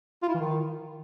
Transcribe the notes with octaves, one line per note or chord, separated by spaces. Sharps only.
F4
E4
E3
D#3